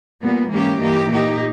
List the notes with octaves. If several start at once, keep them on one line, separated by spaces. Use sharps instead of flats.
A#2 G3 B3
G#2 E3 A#3 C#4 G4
G2 E3 A#3 D#4 G4
A#2 A#3 D#4 G4